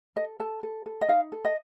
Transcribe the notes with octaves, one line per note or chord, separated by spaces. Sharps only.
A4 D#5
A4 A5
A4
A4
D#5
D#4 F5
A4
D#5